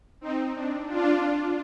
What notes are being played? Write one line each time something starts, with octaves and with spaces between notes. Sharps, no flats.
C4 D#4
D4
D4 F4